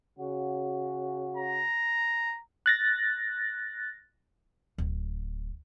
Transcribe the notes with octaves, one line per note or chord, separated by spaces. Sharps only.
C#3 F#4
A#5
F#6 A6 A#6
D1